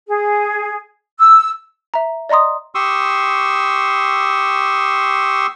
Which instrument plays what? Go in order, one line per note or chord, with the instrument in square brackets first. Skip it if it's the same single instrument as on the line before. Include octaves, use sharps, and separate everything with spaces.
[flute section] G#4
E6
[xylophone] E5 A#5
D5 D#5 A#5 C6 D#6
[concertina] G4 C6 C#6 D#6 E6